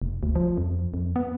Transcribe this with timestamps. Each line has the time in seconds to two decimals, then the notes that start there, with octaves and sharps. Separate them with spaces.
0.02 F1
0.23 D2
0.35 F3
0.58 F2
0.94 F2
1.16 B3